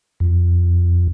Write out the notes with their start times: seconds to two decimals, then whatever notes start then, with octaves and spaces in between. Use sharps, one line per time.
0.20 F2